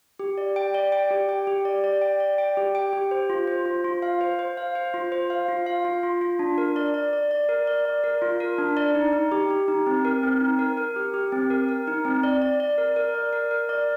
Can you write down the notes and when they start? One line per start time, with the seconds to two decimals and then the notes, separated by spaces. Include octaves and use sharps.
0.19 G4
0.38 D5
0.56 G5
0.74 D5
0.92 G5
1.10 G4
1.29 G5
1.47 G4
1.65 D5
1.84 D5
2.01 G5
2.20 D5
2.38 G5
2.57 G4
2.75 G5
2.93 G4
3.11 C5
3.30 F4
3.48 C5
3.66 F4
3.84 F4
4.02 F5
4.21 C5
4.39 C5
4.57 F5
4.75 C5
4.94 F4
5.12 C5
5.30 F5
5.48 F4
5.66 F5
5.85 F4
6.03 F4
6.21 F4
6.39 D4
6.58 A#4
6.76 D5
6.94 D5
7.13 D5
7.31 D5
7.49 A#4
7.67 D5
7.85 D5
8.04 A#4
8.22 F4
8.40 A#4
8.58 D4
8.77 D5
8.95 D#4
9.13 D#4
9.32 G4
9.50 G4
9.68 D#4
9.87 C4
10.05 A#4
10.23 C4
10.40 D#4
10.59 A#4
10.77 A#4
10.96 G4
11.14 G4
11.32 C4
11.50 A#4
11.69 A#4
11.87 D#4
12.05 C4
12.23 D5
12.42 D5
12.60 D5
12.78 A#4
12.96 A#4
13.15 D5
13.33 A#4
13.51 A#4
13.69 D5